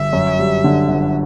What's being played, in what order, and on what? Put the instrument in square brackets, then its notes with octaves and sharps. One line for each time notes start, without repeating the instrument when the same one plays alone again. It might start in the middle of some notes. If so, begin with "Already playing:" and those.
Already playing: [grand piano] G1 [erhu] E5
[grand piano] F#2
G3
D3
G1